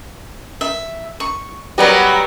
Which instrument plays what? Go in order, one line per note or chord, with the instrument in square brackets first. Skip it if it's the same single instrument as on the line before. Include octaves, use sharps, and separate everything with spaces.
[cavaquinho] E5
C#6
[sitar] F#3 G3 B3 [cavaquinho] F#4 A#4 B4